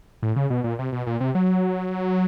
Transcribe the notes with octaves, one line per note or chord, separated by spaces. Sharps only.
A2
C#3
B2
A#2
C3
B2
A#2
C3
F#3